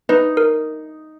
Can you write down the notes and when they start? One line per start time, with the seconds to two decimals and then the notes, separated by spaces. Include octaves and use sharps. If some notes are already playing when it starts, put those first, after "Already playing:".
0.09 D#4 B4
0.37 A#4